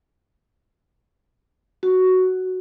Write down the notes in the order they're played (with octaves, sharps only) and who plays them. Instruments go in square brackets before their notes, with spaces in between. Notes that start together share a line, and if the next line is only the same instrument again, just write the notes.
[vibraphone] F#4